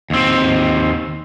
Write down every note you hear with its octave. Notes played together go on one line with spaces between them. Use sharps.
D#2 C4